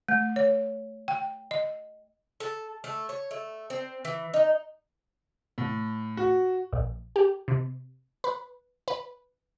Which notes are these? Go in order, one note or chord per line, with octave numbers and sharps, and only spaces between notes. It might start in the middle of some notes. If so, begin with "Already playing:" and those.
A3
C#5
G5
D#5
A4
A3
C#5
A3
C4
E3
D#4
A2
F#4
A#1
G4
C3
B4
B4